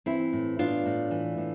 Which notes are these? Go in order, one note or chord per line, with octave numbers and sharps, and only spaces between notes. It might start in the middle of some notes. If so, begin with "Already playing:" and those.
E3 C4 E4
A2
B3 D4 F4
A2
E3
A2